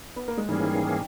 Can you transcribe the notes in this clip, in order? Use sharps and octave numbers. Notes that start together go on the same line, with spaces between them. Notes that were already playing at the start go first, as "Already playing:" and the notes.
B3
A#3
G#3
G#2 D#3 E3 G3 A#3 C#4 G#4
D#3 G3
D#3